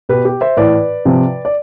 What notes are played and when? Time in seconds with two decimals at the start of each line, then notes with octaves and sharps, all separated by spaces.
0.09 B2 G4 B4
0.25 G4
0.41 C5 E5
0.57 A2 E3 B4 D5
1.05 C3 F3
1.45 D5